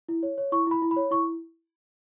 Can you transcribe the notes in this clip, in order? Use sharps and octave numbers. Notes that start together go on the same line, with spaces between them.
E4
C#5
C#5
E4 C#6
E4 B5
E4
B5
C#5
E4 C#6